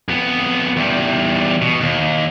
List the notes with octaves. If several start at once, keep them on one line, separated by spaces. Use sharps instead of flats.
F2 B3
E2 G3
B2
D#2